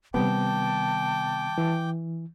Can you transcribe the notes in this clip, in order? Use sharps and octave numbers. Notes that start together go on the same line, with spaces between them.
C3 D#3 G3 B3 G5 A5 D6
E3